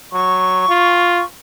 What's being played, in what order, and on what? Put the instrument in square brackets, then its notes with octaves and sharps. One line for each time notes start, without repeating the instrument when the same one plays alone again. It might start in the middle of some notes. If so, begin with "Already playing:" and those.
[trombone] F#3 [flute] C#6
[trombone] F4